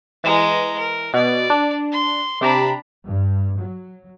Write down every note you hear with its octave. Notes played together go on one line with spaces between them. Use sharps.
E3 G#3 A#5
A#4
B2 D5
D4
C6
C3 D4 G4 A#5 B5
G2
F#3